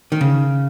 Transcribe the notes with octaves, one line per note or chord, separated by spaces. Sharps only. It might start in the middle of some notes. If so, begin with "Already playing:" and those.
D#3
C#3